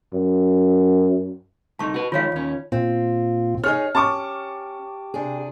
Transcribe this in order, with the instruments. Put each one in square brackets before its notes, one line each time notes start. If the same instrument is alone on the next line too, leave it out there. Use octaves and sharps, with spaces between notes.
[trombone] F#2
[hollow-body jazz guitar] C2 A3 D#4 [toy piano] A5 C#6
[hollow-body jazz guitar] F#4 B4
[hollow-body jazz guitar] D#3 F3 G#3 [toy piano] F4 C#5 F5
[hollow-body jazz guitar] D#2 C#4
[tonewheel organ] A#2 F4 [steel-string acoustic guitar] C4
[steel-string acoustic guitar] D#4 G#4 C#5 [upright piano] F6
[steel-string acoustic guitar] C#4 [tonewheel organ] G4 [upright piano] A5 C#6 D6
[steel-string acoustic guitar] C3 D4 G#4